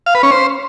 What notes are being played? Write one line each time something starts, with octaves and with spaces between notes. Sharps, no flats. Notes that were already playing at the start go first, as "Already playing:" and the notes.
F5
B4
C#4
C5